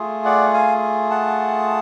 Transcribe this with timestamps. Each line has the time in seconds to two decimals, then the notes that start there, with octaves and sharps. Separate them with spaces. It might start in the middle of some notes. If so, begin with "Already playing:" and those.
Already playing: A3 F4 G#4
0.25 D5 F#5
0.54 F5 G#5
1.10 F#5 A5